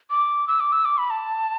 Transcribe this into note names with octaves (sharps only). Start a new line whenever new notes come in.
D6
E6
D6
E6
D6
B5
A5